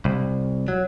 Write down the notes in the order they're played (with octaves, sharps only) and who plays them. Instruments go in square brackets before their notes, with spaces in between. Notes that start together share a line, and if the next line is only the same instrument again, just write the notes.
[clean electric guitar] C2
F#3